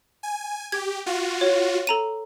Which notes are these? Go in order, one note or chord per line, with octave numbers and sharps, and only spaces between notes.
G#5
G4 G#6
F4 F#4
C#5
A4 A#5 D#7